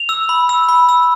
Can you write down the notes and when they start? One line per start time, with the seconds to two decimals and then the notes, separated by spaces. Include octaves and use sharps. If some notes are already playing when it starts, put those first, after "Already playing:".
Already playing: F7
0.09 E6
0.29 B5
0.49 E6
0.69 B5
0.89 E6